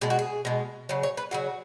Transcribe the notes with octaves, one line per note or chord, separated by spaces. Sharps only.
B2 G#3 G#4
F#4
G#4
B2 G#3
C#3 F#3 C#5
C#5
B4
C#3 F#3 F#4